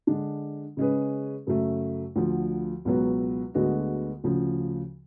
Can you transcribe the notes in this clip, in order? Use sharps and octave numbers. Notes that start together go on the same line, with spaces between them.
D3 G#3 D4
C#3 G#3 C#4 G#4 B4
F#2 C#3 F#3 A3
D2 D3 F3
C#2 B2 F#3 B3 F#4
D2 D3 G#3 B3 F#4
D2 C#3 F3